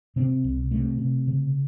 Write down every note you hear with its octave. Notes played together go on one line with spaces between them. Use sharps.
C3 C4
C2
C3 A3
C3
C#3